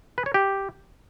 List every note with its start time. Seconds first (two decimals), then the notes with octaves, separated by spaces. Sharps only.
0.18 B4
0.26 C#5
0.34 G4